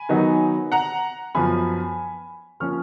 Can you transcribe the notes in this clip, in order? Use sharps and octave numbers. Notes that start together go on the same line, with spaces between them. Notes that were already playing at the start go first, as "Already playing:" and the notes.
Already playing: G#5 B5
D#3 F#3 B3 D#4
F#5 A#5
F#2 F3 B3 G#5 B5
F3 A#3 C#4 C#6 F6